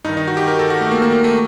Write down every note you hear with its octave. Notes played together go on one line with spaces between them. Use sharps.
G2 D#3 D#4
D#4
F#4
G4
A#4
A4
F#4
A3
A#3
A#3
A#3
A3